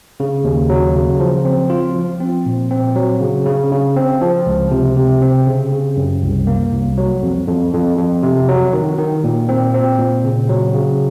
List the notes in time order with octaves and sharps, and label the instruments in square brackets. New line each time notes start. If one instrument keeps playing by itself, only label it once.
[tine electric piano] C#3
D#2
F#3
C#3
F3
C4
F4
F3
C4
A#2
C4
F#3
C#3
C#3
C#3
C4
F3
C#2
C3
C3
C4
C#3
C#3
F#2
C2
A#3
C2
F#3
F2
F2
F2
F2
C3
F#3
D#3
D#3
A#2
C4
C4
A#2
C#3
F#3
C#3